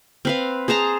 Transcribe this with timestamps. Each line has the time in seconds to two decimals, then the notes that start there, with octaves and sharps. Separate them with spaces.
0.25 C4 B4 F5
0.68 G#4 C5 A5 A#5